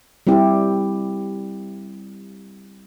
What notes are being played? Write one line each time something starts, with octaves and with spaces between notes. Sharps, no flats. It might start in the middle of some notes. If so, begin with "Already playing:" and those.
G3 C4 E4 G4